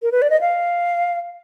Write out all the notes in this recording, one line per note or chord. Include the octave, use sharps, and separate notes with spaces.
A#4
B4
D5
D#5
F5